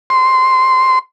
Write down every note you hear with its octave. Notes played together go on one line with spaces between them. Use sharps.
C6